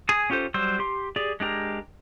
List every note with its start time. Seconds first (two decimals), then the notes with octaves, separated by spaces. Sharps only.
0.09 G#4 G#5 D#6
0.30 C#4 F4 G4 A4 C5
0.54 F#3 G3 C5 E6
0.79 G4 C6
1.16 G4 G#4 D5
1.40 G#3 D4 G4 A#4